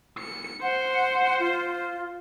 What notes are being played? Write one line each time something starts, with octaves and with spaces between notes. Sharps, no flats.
C#7
C5 F#5
F4